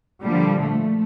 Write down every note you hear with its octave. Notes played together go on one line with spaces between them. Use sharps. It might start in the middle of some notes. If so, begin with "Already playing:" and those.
A#2 D3 F3 G3
A3